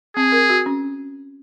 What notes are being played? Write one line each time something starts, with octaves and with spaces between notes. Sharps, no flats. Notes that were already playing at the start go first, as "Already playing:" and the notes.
C4 G#4
A#4
F#4
C#4